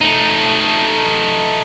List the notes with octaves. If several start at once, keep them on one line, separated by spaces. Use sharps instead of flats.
A3 D#4